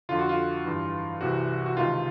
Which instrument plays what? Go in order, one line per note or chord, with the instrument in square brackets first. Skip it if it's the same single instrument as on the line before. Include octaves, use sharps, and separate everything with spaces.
[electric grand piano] F2 D3 F4
F#4
F4
G2 E3
C2 C3 E3 F#4
F#4
C#2 C3 D#3 F4